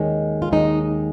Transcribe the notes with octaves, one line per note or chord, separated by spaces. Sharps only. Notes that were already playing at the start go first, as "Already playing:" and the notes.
Already playing: D#2 D#3 G#3 C#4
F4
D#2 D#3 G#3 C#4 D#4